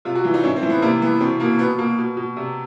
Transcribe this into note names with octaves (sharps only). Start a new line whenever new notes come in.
C3 F4
F#4
E3 F4
D#4
A2 C#4
C4
E3
B3
C3 A#3
E3 B3
B2 C4
B2 A#3
B2 B3
B2 A#3
B2
B2
C3